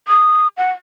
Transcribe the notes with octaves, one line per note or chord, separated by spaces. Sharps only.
D#6
F#5